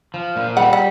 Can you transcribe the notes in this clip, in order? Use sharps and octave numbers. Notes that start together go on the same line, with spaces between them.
F3
A#2
G3 F#5
F#5